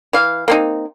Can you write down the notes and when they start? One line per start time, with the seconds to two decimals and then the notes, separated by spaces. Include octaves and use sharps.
0.13 E3 F5
0.48 A#3 C4 D#4